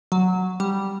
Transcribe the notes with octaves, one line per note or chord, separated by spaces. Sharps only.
F#3
G3